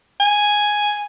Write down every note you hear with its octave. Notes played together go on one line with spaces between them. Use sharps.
G#5